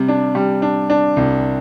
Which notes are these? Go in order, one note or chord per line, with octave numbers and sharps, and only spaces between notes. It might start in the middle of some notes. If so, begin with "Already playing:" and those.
Already playing: C3 G3
D4
G3
D4
D4
C2